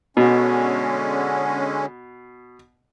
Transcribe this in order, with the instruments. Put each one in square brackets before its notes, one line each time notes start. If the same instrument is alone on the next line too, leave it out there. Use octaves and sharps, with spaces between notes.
[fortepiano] B2 [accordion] D3 G#3 C#4